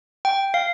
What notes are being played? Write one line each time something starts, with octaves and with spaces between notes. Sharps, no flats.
G5
F5